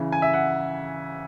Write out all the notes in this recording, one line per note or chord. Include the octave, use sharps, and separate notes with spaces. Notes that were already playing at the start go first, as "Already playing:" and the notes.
Already playing: C#3 E3
G#5
E5
F#5